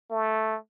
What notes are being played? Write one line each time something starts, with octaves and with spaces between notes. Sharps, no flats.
A3